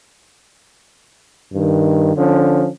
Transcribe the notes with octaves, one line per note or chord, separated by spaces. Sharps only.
G2 D#3
D3 F3 C#4